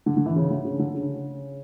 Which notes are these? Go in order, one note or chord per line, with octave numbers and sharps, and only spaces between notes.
D3
D3
E3
C#3
D3
C#3
D3
C#3